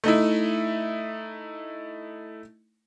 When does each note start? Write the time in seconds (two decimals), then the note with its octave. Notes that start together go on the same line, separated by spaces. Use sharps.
0.04 A3 D#4 E4